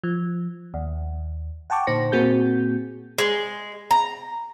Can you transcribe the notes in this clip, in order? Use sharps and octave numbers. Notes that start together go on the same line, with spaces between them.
F3
D#2
F#5 G5 A5 C#6 D6
A#2 D3 D#4 C5 A#6 C#7
A#2 A#3 C4 F#4 G#4 G6
G#3
A#5